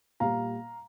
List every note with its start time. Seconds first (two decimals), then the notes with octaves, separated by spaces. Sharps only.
0.20 A#2 G3 F5 A#5